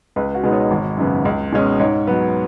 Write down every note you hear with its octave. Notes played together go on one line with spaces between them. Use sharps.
C#2 B4
F#4
B2 G#3 B3 D#4
C#5
G#1
F#2 C#3 B3
C#2
B2 G#3 C#4
G#2 C#5
F#3 B3